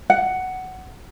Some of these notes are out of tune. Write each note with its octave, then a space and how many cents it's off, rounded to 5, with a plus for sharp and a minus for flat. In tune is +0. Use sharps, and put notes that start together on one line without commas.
F#5 +10